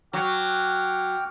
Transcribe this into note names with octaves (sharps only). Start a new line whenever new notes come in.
F#3 G5 D6 F6